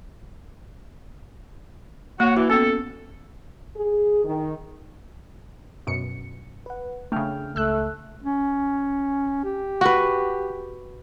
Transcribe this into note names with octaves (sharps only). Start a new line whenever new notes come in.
A#3 F#4 C#5 F#5
E3 F#4
B3 C#4 A4
G#4
D#3
F#2 B2 C#7
B4 F#5
C#3 A3 D4 G5 F6
C#2 A3 E6 F#6
C#4
G4
F#4 B4